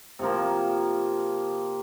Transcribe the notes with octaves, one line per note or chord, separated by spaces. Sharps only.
C3 F3 A#3